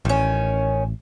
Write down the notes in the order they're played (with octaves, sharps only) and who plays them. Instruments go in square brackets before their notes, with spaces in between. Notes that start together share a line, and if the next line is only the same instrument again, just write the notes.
[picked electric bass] A1 [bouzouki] D#3 C#4